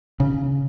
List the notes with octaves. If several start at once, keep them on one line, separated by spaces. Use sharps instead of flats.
C#3